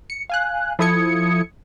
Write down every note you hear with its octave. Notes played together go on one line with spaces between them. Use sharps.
C#7
F5 G#5 F#6
F3 E4 A4 D#6 G#6 C#7